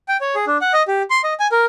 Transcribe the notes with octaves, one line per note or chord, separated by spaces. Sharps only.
G5
C#5
G#4
D4
F#5
D#5
G4
C6
D#5
G#5
A#4